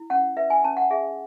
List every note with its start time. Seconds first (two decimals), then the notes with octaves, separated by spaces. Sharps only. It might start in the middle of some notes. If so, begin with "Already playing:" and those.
Already playing: E4
0.10 C#4 F#5
0.37 B4 E5
0.50 G#5
0.64 C#4 A5
0.77 F#5
0.91 G#4 E5